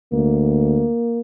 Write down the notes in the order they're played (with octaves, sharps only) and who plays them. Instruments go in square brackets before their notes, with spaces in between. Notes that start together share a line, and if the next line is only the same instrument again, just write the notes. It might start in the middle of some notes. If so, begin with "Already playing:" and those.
[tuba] D2 [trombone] A#3